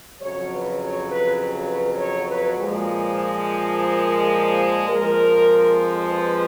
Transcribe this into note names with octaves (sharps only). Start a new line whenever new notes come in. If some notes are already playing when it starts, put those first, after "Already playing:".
F2 C#3 F#3 C#5
B4
C#5
B4
B4
C#5
B4
A#2 F3 G#3
A#4
F2 F3 G#3 A#4
B4